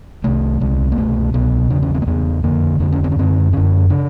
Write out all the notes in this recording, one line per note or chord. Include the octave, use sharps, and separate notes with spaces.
C2 C3 A3
C2 C3 G#3
A#3
C2 B2 A3
C2 B2 B3
E2 C#3 D4
C#4
C4
A#3
E2 C#3 B3
F2 D3 A#3
F2 D3 D4
C#4
C4
C#4
F#2 D3 C4
F#2 D3 C#4
C#3 D4